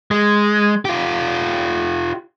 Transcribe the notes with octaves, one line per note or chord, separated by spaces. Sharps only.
G#3
F4 G4